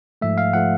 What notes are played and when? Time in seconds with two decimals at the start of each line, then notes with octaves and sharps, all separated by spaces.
0.21 G#2 F3 A3 E5
0.38 F5
0.53 F3 A3 F#5